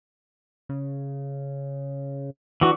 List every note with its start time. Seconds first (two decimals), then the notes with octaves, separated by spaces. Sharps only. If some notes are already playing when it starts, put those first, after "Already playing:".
0.69 C#3
2.61 E3 D4 F#4